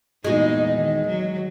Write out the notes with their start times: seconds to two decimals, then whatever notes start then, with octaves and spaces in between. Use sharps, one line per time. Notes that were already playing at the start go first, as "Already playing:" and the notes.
0.24 E2 A#2 G#3 D#4 F#4
0.73 D#3
1.07 F#3